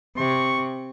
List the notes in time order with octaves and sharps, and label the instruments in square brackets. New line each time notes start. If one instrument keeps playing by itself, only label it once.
[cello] C3 [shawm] C#6